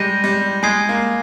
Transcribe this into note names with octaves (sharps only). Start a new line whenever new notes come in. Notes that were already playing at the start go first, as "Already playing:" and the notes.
Already playing: G3 G#3 G6 A#6 D#7
G3
G#3 G#5 D#6 G#6 C7 D#7
A#3